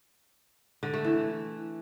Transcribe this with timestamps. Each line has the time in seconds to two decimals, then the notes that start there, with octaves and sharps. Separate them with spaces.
0.83 D3
0.94 A3
1.04 E3